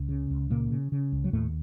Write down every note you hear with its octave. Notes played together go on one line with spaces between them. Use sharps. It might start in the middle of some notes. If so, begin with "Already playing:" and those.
Already playing: C#2
C#3
C#2
A#2 C#3 A#3
C#3
C#3
C#2
F#3
D#2 A2 A3